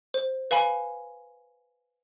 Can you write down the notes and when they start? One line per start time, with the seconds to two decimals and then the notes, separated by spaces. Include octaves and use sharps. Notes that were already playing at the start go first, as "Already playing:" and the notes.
0.14 C5
0.51 B4 F5 G#5 B5